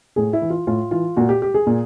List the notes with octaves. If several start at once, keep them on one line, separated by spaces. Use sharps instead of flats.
A2 G#4
E4
E3
F4
A2 F4
E3 F4
A#2 F#4
G4
G4
G#4
A#2